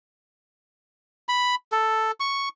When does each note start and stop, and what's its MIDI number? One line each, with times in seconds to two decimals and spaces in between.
1.29 1.55 83
1.72 2.11 69
2.20 2.49 85